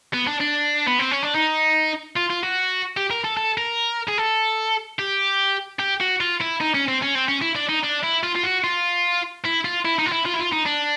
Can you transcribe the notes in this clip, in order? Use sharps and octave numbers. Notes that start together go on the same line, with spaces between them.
B3
D4
D4
B3
C4
C#4
D4
D#4
F4
F4
F#4
G4
A#4
A4
A4
A#4
G#4
A4
G4
G4
F#4
F4
E4
D#4
C#4
C4
C#4
C4
C#4
E4
D4
D#4
D4
E4
F4
F4
F#4
F4
E4
F4
E4
D#4
F4
E4
F4
E4
F4
D#4
D4